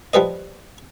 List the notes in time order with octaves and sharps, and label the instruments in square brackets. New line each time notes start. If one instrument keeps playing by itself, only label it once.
[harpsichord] F3 G3 B4 D#5